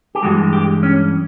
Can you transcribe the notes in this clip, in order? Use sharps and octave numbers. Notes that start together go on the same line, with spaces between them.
G4
G2 E3 G#3 F#4
G4
C#4